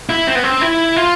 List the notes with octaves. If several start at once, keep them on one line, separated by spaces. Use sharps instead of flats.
E4
C4
B3
C4
E4
F4